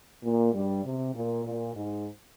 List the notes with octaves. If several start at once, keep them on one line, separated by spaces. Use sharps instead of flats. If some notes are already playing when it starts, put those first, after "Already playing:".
A#2 A#3
G2 G3
C3
A#2
A#2
G#2